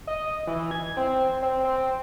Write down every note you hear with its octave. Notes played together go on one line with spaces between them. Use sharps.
D#5
E3
G#6
C4
C4
C4